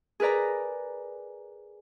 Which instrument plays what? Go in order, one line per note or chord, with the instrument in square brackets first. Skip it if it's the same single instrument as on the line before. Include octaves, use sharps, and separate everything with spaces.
[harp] G#4 A#4 B4 D5 A#5